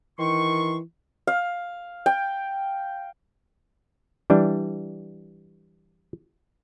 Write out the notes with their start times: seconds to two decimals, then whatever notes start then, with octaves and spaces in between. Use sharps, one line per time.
0.19 D#3 E3 C6 C#6
1.27 F5
2.06 G5
4.30 E3 G3 D4